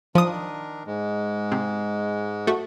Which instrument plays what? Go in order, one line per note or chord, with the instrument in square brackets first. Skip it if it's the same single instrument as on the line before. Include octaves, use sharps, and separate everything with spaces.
[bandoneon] D#3 D4 A#4 [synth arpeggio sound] F3 D#6
[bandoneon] G#2 G#3
[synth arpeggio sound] C3
A3 F#4